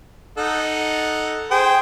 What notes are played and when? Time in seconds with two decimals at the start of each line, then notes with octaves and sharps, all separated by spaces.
0.38 D#4 A4 F#5
1.51 G#4 C5 G5